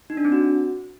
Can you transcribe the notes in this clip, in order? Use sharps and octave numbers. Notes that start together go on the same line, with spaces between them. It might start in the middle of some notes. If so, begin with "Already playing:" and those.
D#4
D4
C4
F#4